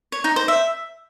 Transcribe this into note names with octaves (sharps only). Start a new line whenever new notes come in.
C#5
D#4
C5
E5